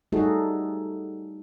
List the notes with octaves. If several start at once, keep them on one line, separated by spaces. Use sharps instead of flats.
G3 A3 D#4 F#4 G#4 A4